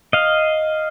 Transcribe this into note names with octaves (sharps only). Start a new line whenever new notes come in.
D#5 F5